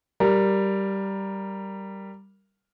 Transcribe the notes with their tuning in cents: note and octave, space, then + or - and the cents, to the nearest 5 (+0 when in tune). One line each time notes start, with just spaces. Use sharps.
G3 -5 A#4 +0